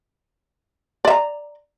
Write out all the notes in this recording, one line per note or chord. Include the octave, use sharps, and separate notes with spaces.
D5 E5 A#5